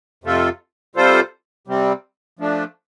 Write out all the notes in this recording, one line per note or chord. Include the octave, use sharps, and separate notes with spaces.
F2 C3 A3 F4 A4
C3 G3 F4 A4 C5
C3 G3 C4
F3 A3 D4